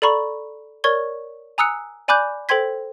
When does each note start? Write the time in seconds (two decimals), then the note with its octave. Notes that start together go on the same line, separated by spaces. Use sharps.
0.02 A4 D5 A#5 B5 C#6
0.84 A#4 C#5 D5 C#6 G#6 G7
1.58 G#5 A#5 D#6 E6 F#6 C#7
2.08 D5 G#5 B5 D6 F#6 G6
2.49 A4 C5 G5 C6 G#6 B6